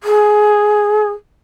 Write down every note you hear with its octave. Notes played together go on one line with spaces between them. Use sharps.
G#4